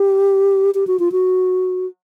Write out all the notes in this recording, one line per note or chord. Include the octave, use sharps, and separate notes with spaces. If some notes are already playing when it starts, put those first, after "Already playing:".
Already playing: G4
G4
F#4
F4
F#4